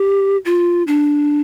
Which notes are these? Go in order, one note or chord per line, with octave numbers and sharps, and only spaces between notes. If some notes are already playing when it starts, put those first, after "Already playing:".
Already playing: G4
F4
D4